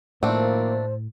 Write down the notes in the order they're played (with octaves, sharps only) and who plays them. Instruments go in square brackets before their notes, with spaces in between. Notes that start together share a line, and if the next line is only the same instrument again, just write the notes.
[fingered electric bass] A2 [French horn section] D#3 F3 A#3 [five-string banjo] A3 C4 D4 [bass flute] C5